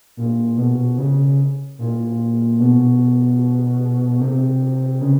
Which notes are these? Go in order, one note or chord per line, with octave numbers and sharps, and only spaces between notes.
A#2
B2
C#3
A#2
B2
C3
C#3